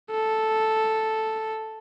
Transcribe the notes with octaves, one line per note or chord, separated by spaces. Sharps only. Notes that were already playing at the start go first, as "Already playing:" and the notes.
A4